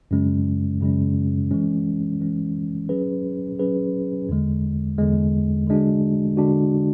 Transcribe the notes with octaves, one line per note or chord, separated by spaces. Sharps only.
F#2 C#3 G#3 C#4
F#2 C#3 G#3 C#4
E3 G#3 C#4
E3 G#3 C#4
F#3 C#4 G#4 B4
F#3 C#4 G#4 B4
E2 D3 G#3
E2 D3 G#3
D3 G#3 D4 F#4
D3 G#3 D4 F#4